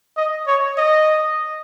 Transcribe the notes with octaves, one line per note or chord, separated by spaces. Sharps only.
D#5
C#5
D#5